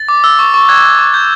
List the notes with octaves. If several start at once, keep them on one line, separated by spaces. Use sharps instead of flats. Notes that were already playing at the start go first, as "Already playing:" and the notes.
Already playing: A6
D6
E6
C#6
C#6
F#6 G#6
F#6
C#6
G6